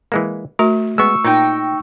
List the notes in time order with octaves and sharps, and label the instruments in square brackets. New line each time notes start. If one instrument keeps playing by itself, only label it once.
[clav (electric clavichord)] E3 G#3 A#3
[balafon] A3 F#4 [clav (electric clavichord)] A#4
[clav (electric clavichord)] G#3 B3 [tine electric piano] C#6 E6
[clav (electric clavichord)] A#2 [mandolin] D#4 G5